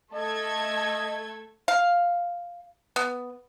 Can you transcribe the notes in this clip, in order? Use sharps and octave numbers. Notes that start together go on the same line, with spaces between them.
A3 A4 D#5 G#6
F5
B3